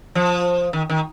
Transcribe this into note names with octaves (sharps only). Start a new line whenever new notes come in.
F3
D#3
D#3